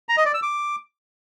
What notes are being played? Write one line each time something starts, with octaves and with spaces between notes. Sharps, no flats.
A#5
D#5
D5
E6
D6